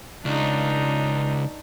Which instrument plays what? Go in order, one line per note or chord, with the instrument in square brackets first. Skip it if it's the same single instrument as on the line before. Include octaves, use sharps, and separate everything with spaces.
[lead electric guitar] C#2 [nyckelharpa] D4 D#4